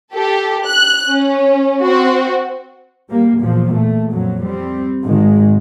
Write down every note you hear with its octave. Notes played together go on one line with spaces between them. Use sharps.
G4 A4
F#6
C#4
C4 F#4
G3 A#3
E2 A#2 F3
A3
F2 A#2 F#3
G3 C4
G#1 D#3 G#3